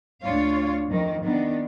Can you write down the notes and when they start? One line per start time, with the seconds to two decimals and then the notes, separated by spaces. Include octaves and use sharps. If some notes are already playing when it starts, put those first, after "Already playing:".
0.21 D2 D4 F4 C#5 F5
0.87 F2 D#3
1.23 D#3 B3 D4